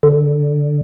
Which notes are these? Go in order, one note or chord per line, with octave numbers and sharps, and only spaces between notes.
D3